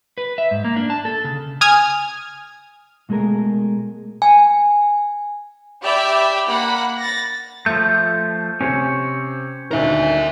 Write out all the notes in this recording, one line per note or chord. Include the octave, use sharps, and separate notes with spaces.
B4
E5
G#2
A#3
D4
A5
A4
C#3
G#5 D#6 F6 G#6
B2 G#3 A3 G#4 A#4
G#5
G4 D5 E5 G5 B5
A#3 F#5 B5
A6 A#6
F3 A3 G6
C3 C#4 C5 C#5
D2 A#2 D#3 A#4 E5